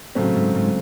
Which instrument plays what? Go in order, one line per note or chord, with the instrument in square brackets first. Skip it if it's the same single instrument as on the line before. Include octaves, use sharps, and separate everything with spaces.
[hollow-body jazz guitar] A2 [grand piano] C#3 F#3 A3 C4
[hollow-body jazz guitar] G#2
G#2